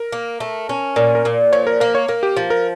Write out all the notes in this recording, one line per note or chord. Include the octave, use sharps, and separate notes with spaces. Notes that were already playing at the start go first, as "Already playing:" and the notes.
Already playing: A#4
A#3
A3
C#4
A#2 A#4
A#4
A#2
F3 C#5
A#4
A#3 A#4
C#5
A#3 A#4
G4
F3
A#4